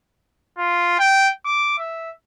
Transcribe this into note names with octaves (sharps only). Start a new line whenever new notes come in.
F4
G5
D6
E5